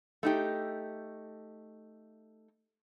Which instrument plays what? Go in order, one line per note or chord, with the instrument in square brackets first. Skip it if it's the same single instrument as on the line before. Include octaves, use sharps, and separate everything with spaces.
[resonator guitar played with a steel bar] A3 D#4 G4